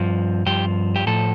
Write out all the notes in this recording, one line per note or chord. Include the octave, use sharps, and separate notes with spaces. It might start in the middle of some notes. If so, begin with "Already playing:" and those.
Already playing: G2 F3
G2 F3 G4
G4
A2 F3 A4